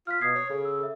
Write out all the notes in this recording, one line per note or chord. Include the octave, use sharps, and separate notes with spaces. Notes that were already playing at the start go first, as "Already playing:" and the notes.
F4 F6 F#6 B6
B2 D#6 G#6 C7
C#5
C#3 A4
E6
A4 E5